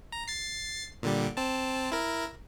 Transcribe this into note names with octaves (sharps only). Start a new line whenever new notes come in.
A#5
A6 C7
A#2 D3 G3
C4 A5
E4 A#4